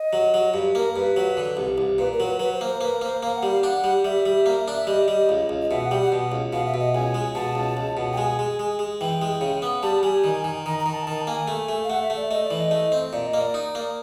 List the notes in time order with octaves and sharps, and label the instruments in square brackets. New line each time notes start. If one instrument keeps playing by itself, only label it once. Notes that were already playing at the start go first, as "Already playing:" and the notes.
Already playing: [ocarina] D#5
[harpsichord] F#3
F#3
G2
[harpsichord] A#3 [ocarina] A#4
[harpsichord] G2 [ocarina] B4
[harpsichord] F#3
D3
C2
C2
[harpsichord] A#2 [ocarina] B4
[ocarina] A#4
[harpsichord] F#3
[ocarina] B4
[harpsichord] F#3 [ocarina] B4
[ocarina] C5
[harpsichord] A#3
[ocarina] C5
[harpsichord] A#3 [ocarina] B4
[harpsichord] A#3 [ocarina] C5
[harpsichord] A#3 [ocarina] F5
[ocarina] F#5
[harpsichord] G3
[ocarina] F5
[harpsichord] D4 [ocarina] F#5
[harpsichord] G3
[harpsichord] G3 [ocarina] E5
[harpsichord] G3
A#3
D4
[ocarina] E5
[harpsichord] G3 [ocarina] D#5
[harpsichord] G3
C#2
C#2
[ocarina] D#5
[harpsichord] B2 [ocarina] E5
[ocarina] F#5
[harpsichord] G3 [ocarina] G5
[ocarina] F#5
[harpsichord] B2
C#2
[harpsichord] B2 [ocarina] F5
[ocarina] E5
[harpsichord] B2
[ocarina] D#5
[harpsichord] C#2 [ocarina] G#5
[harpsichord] G#3
[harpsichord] B2 [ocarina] A5
[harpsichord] C#2
C#2
B2
[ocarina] G5
[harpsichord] G#3 [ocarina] G#5
[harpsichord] G#3
G#3
G#3
[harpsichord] E3 [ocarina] G5
[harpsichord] G#3
C#3
B3
[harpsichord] G3 [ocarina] A5
[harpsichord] G3 [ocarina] G#5
[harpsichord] D#3
D#3
[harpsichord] D#3 [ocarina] A#5
[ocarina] A#5
[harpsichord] D#3
[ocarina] A5
[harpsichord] D#3 [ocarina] A5
[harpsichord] A#3 [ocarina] G#5
[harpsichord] A3
A3
[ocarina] F5
[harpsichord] A3 [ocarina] F#5
[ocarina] E5
[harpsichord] A3
[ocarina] D5
[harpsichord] A3 [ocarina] D#5
[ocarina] D5
[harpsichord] E3
[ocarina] D#5
[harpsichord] A3
C4
[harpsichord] A#2 [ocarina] D5
[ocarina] D#5
[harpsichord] A#3
[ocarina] D5
[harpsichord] D#4
A#3